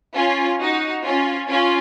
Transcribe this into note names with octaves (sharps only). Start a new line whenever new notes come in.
C#4 F4
D#4 F#4
C#4 F4
C#4 F4